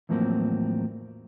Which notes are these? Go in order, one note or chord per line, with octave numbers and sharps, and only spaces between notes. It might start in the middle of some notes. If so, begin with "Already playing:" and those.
E2 A2 F3 F#3 A#3 C4